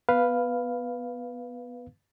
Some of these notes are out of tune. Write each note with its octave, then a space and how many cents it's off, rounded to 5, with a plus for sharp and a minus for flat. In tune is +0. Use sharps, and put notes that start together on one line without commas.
B3 +0 B4 +0 F5 +0